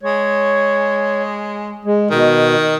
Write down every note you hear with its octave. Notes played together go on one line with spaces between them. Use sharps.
G#3 C#5
G#3
B2 D#3